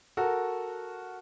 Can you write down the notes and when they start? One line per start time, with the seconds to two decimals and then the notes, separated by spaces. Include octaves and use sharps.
0.17 F#4 A4 A#4